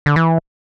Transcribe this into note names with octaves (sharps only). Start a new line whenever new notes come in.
D3
E3